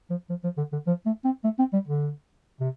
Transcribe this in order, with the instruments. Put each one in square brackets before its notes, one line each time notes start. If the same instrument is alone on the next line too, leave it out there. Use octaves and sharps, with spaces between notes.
[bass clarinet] F3
F3
F3
D3
D3
F3
A3
C4
A3
C4
G3
D3
C3